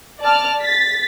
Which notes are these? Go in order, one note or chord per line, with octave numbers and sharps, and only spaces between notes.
D5 A5 F6
A6 B6